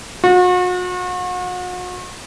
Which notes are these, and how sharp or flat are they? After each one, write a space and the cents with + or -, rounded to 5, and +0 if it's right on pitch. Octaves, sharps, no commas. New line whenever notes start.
F#4 -40